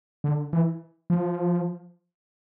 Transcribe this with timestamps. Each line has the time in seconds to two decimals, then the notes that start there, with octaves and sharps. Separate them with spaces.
0.24 D3
0.53 E3
1.10 F3